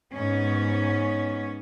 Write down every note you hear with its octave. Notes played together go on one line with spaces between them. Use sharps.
G#2 B3 C#4